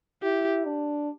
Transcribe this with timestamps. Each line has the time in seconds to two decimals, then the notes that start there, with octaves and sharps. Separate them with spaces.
0.23 E4 G4
0.65 D4